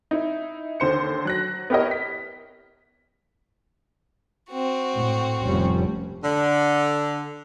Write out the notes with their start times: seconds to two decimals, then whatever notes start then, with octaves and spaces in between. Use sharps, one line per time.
0.11 D#4 E4
0.80 D#2 D3 C5 C#7
1.25 F#3 F#6 A#6
1.70 B3 E4 G4 A#4 C#5 D#5
1.91 B6
4.51 C4 F#4
4.96 A2
5.43 F1 G3 C#4
6.24 D3